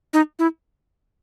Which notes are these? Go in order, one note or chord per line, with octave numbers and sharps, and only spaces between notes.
D#4
E4